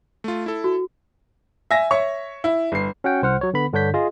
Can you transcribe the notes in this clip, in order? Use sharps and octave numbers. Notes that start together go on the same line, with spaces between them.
A3 F4
E4 A4
F#4
E5 G#5 A#6
C#5 E5 C#6
E4
G1 C7
C#4 F#4 F#5 G5
C2 C5 F#5 F6
F#3 C#5
D3 B3 B5
G2 D3 D4 C#5 G6 B6
F4 G#4 D#5